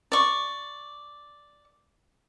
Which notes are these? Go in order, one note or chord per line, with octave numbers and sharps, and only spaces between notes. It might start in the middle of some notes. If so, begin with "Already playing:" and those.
D5 C#6